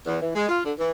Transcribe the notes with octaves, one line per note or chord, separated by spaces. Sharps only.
E2
E3
G#3
F4
D3
E3